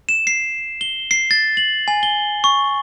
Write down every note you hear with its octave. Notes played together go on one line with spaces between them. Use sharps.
E7
C7
G7
C7
A6
F#7
G#5
G7
C#6